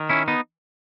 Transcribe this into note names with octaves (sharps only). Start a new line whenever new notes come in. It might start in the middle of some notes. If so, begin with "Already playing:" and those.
Already playing: D#3
C#4 E4
B3 D#4